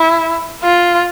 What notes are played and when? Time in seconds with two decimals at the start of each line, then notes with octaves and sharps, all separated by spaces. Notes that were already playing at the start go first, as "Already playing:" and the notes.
Already playing: E4
0.63 F4